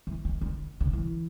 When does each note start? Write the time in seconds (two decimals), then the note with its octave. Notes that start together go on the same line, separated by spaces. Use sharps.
0.07 E3
0.25 D#3
0.41 D3
0.80 C#3
0.93 E3